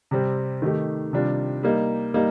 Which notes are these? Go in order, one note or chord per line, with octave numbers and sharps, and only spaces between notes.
C3 G3 C4
D#3 A3 D#4 G4
C3 D#3 G3 D4 F4
G3 A#3 D#4
G3 A#3 D#4